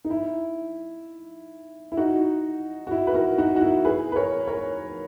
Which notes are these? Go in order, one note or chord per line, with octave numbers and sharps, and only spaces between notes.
D#4
E4
E4
D#4 F#4
F#4
E4
B4
F#4 A#4
D#4 F#4
F#4
E4
G#4 B4
B4
A#4 C#5
A#4 C#5